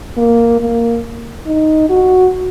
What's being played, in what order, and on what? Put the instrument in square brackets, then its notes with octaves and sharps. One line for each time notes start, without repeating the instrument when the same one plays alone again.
[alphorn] A#3
A#3
D#4
F#4